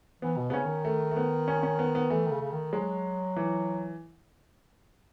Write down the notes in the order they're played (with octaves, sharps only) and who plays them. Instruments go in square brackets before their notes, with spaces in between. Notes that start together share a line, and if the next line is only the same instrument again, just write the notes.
[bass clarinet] E3 [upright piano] B3
[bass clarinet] B2
[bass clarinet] C#3 [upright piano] B3 C#4
[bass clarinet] D#3
[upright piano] A3
A3
B3
C#4
C#4
B3
B3
[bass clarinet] E3 [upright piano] A3
[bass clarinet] D#3
C#3
C#3
D#3
[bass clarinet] F#3 [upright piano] G#3
[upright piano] E3